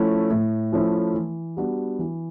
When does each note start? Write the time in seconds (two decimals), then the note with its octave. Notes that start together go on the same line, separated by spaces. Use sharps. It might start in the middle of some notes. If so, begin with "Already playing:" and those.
Already playing: F3 A3 C#4 E4
0.30 A2
0.72 F3 A3 C#4 E4
1.14 E3
1.57 G3 B3 D4 F#4
1.99 E3